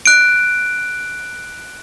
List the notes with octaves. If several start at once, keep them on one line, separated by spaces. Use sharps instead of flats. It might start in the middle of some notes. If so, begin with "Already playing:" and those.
F#6 D7